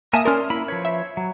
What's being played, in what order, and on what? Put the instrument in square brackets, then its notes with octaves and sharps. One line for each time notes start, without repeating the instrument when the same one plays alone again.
[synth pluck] A#3 E5 D#6 [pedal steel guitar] A#4 G#5 A5
[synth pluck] C#4 A#4 [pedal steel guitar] D5 C6 F6
[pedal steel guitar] A#3 E4 B5
F3 B4 C#5
[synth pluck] E5
[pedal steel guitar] F#3